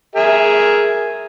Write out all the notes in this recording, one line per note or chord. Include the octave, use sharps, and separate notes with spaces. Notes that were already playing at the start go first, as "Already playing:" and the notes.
G#4 A#4 E5